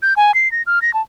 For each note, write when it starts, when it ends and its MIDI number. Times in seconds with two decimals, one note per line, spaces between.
0.02 0.14 91
0.16 0.34 80
0.34 0.51 96
0.52 0.62 94
0.66 0.82 89
0.82 0.93 94
0.94 1.02 81